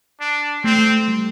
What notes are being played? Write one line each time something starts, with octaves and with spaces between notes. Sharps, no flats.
D4
A3 C4
A3
G3